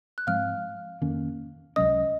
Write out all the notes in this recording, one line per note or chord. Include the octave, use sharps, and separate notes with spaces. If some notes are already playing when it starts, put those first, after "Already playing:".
F#6
G#2 F3 G#3 C4 F5 F6
F2 D#3 A#3 C#4
C#2 C3 F#3 C#4 D#5 D#6